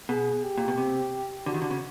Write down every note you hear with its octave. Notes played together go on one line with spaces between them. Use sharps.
B2 G#4
G4
A#2
B2
C3
D3 F#4
D#3
D3
C#3